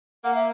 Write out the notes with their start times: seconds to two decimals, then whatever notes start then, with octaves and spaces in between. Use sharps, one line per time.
0.24 A#3 F#5
0.35 E5